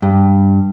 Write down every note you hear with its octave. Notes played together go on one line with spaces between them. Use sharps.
G2